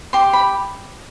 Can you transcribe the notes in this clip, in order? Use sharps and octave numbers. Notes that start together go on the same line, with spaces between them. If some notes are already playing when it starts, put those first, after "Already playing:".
G4 C6
B5